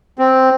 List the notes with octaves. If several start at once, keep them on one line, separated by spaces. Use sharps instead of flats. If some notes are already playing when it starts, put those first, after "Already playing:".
C4